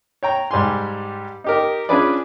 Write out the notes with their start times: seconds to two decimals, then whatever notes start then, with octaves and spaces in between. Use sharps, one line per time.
0.23 C#5 G5 A#5
0.51 G#2 G3 G4 G#5 C6
1.44 D#4 G4 A#4
1.89 C#4 D4 F4 G#4 B4 D5